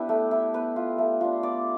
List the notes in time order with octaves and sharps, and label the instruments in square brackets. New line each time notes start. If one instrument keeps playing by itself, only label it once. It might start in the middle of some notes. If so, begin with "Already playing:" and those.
Already playing: [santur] B3 D4 E4 G4 B4
A3
E4
B3 B4
F4
A3
D4 F4
B3 D5